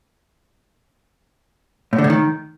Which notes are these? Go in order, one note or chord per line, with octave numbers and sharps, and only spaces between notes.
A2
D3
A2
D#3